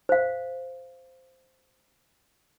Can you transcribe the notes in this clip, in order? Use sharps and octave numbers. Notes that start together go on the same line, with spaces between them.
C5 F5